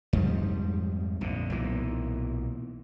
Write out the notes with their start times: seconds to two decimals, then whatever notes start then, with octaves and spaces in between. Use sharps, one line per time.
0.13 F2 G#2 F3 G3
1.21 A#1 F2 D3
1.50 B1 A#2 E3